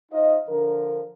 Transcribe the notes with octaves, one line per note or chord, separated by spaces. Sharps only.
D#4 F4 C5 D#5
D3 F3 D4 A#4